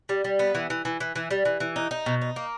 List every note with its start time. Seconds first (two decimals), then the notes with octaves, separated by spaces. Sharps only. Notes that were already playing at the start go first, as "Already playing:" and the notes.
0.09 G3
0.24 G3
0.39 B3
0.55 E3
0.70 E3
0.85 E3
1.00 E3
1.16 E3
1.31 G3
1.45 E3
1.60 E3
1.76 D#4
1.91 D#4
2.06 B2
2.21 D#4
2.36 A#3